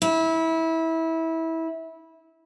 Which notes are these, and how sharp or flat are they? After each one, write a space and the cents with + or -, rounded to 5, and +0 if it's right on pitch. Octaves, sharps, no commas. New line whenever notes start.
E4 -20